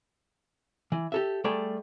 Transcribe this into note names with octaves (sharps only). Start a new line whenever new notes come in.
E3
G4 A4 E5
G3 A3 G#4 A4 G5